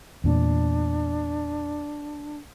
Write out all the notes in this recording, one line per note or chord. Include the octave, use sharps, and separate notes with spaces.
E2 A#2 D4